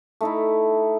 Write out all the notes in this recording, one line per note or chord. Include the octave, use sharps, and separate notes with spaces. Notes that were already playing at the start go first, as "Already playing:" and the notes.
A3 D#4 E4